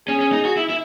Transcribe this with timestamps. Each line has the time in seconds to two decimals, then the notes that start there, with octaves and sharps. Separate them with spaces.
0.08 C#4 G#4
0.20 C#4
0.32 D#4
0.45 F#4
0.57 E4
0.70 E4